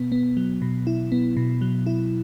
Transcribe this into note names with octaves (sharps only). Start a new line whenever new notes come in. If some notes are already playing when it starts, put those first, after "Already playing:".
Already playing: B2 B3
B3
F#3
B2
E4
B3
B2
F#3
E4